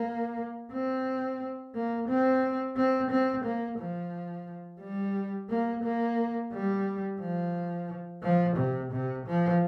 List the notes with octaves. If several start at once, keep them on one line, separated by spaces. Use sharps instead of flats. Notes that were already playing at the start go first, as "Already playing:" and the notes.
Already playing: A#3
C4
A#3
C4
C4
C4
A#3
F3
G3
A#3
A#3
G3
F3
F3
C3
C3
F3